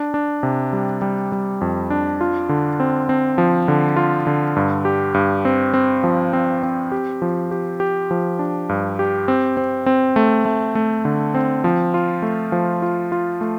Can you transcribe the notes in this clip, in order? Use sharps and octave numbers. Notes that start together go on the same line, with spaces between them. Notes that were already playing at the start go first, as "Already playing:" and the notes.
Already playing: D4
D4
C3
G3
G3
G3
F2
D4
F4
D3
C4
C4
F3
D3
F4
D3
G2
G4
G2
C4
C4
F3
C4
C4
G4
F3
G4
G4
F3
D4
G2
G4
C4
C4
C4
A3
A3
A3
D3
C4
F3
F4
A3
F3
F4
F4
A3